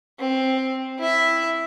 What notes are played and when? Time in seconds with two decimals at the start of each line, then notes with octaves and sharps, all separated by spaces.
0.19 C4
0.99 E4 E5